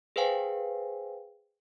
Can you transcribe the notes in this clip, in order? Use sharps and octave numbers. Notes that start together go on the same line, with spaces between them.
G#4 B4 C5 F5 G5 G#5